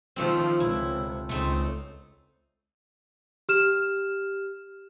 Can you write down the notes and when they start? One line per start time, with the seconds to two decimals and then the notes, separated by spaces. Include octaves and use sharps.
0.16 D#3 F3 A3 C4
0.60 C#2 C3 E4
1.29 C#2 A3 C4 D#4
3.49 G4 F6 E7